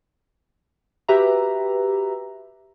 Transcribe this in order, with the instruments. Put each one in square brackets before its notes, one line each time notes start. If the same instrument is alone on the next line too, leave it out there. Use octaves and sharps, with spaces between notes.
[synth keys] F#4 G4 B4 E5 A#5